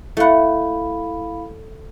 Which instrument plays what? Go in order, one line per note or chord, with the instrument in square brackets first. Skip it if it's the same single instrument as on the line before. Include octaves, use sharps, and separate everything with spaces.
[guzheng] A3 F#5 [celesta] E4 F5 B5